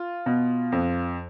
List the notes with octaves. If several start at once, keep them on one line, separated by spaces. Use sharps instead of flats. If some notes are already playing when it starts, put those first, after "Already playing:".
Already playing: F4
B2
F2